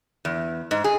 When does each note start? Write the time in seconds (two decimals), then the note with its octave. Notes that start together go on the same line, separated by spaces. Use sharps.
0.25 E2
0.71 G#2
0.84 G#4